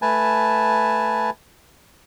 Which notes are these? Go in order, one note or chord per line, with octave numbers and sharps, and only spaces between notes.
A3 B4 G#5 A5